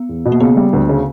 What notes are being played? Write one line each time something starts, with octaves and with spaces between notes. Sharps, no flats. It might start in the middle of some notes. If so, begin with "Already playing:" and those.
Already playing: B3
E2
B2
A#3
C#3 B3
G3
D2
C#3